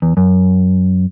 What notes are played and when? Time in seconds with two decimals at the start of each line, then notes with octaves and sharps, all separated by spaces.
0.02 E2
0.17 F#2